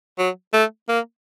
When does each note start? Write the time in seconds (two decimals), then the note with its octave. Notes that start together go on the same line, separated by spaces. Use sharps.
0.19 F#3
0.53 A3
0.89 A#3